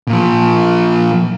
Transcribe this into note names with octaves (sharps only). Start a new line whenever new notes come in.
A#2 F3